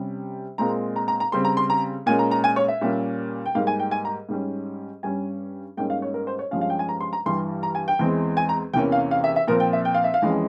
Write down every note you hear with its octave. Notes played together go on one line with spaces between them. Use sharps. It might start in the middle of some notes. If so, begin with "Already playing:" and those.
Already playing: C3 G3 C#4
A#2 G#3 C4 A#5
A#5
A#5
A#5
C#3 G3 C4 C6
A#5
C6
A#5
A#2 G#3 C#4 G#5
A#5
A#5
G#5
C#5
E5
A#2 G3 A#3 C#4
G5
G#2 G3 A#3 F5
G#5
G5
G#5
A#5
G#2 G3 C#4
G2 G3 C#4 G#5
G#2 G3 A#3 C#4 G5
F5
C#5
A#4
C5
C#5
G2 F3 G#3 C#4 F5
F5
G5
G#5
A#5
C6
A#5
G2 E3 G3 C6
A#5
G#5
G5
E2 E3 G#3 C4
G#5
A#5
E2 C3 E3 A#3 C#4 G5
F5
F5
E5
E5
A#2 F3 C4 A#4
G5
E5
G5
F5
E5
F5
F2 E3 G#3 C#4